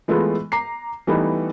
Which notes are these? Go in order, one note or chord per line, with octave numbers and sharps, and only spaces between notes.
E3 G#3 A3 B3 F4
A#5 D6 C7
E3 G3 A3 B3 D#4